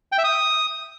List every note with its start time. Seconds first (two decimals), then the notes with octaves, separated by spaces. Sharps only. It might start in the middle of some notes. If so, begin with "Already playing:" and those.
0.12 G5
0.18 E5
0.24 D#6